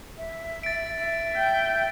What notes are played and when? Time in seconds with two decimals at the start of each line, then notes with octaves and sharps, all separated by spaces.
0.18 E5
0.63 A6 D7
0.96 E5
1.37 G5